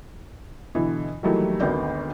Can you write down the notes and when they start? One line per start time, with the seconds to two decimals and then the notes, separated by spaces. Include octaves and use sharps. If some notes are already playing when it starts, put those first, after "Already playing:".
0.75 B2 D3 E3
1.23 D#3 E3 F#3 G3 A3 A#3
1.60 G#1 D2 B3 A#4 D5 G6